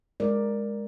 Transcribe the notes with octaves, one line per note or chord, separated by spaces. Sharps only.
G#3 A#4 D5